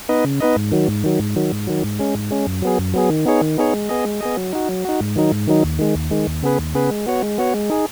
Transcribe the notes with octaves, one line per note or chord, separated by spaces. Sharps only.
B3 D#4 B4 D#5
C#3
B3 D#4 B4 D#5
G#2
D#3 F#3
G#2
D#3 F#3
G#2
D#3 F#3
G#2
D#3 F#3
G#2
G#3 C#4
G#2
G#3 C#4
F#2
F#3 B3 G#4
F#2
F#3 B3 G#4
D#3
B3 D#4 G#4 C#5
D#3
B3 D#4 G#4 C#5
G#3
B3 G#4 D#5
G#3
B3 G#4 D#5
F#3
D#4 F#4
F#3
D#4 F#4
G#2
D#3 F#3 D#4
G#2
D#3 F#3 D#4
D#2
D#3 G#3
D#2
D#3 G#3
D#2
C#3 B3 G#4 B4
D#2
C#3 B3 G#4 B4
G#3
B3 F#4 C#5
G#3
B3 F#4 C#5
G#3
D#4 G#4